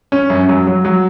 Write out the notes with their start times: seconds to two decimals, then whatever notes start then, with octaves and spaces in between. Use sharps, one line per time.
0.12 C#4
0.30 F#2
0.49 F#3
0.67 F#3
0.85 F#3